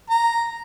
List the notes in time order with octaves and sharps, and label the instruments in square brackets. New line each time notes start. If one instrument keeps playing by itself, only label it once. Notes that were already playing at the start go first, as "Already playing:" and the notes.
[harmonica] A#5